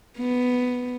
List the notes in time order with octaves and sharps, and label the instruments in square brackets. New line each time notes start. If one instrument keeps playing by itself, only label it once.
[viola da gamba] B3